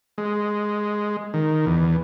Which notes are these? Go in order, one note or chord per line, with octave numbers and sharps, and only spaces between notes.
G#3
D#3
E2